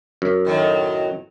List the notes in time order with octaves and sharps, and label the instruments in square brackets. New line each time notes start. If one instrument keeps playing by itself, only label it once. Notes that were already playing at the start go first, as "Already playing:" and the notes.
[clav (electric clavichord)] F#2
[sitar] A2 D#3 F#3